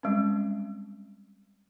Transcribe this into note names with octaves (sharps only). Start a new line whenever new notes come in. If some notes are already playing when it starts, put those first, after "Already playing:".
G3 G#3 C4 C#4